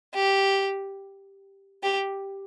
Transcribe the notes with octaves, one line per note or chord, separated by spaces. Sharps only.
G4
G4